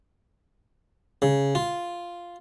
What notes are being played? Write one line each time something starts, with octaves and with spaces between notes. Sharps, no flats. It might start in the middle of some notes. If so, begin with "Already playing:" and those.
C#3
F4